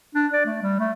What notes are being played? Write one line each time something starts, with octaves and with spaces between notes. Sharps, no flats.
D4
D5
A3
G3
A3